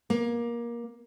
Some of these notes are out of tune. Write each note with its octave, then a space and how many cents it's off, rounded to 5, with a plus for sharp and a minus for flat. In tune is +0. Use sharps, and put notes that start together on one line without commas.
A#3 +20